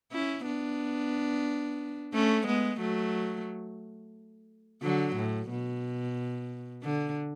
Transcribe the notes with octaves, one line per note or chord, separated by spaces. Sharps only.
C#4 E4
B3 D4
A3 C#4
G#3 B3
F#3 A3
D3 F#3
A2
B2
D3